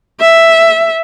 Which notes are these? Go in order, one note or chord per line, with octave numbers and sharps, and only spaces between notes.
E5